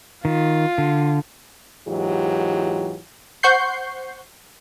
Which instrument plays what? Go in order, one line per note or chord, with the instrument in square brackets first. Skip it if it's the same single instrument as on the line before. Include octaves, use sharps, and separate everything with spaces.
[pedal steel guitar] D#3 [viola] F4
[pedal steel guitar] D3
[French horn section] E2 G#2 E3 F#3 F4 G4
[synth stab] C5 F#5 C#6 G6 C7